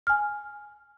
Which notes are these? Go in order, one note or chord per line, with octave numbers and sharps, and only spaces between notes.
G#5 F6